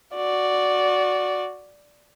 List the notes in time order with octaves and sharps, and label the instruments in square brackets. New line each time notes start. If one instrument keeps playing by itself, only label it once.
[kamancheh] F#4 D5